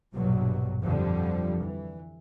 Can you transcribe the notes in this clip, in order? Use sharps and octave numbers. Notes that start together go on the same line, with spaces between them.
A#1 G2 B2 F#3
F2 D3 F3 G3
E3